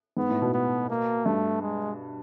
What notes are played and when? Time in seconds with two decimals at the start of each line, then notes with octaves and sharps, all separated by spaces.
0.17 G#2 B3
0.30 A2
0.42 B2
0.54 B3
0.90 A#3
1.25 G2 A3
1.62 G#3